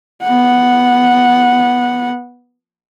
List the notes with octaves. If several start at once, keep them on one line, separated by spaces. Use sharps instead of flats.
B3 F#5